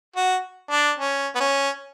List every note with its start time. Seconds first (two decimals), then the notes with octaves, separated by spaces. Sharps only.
0.16 F#4
0.71 D4
0.98 C#4
1.35 B3
1.40 C#4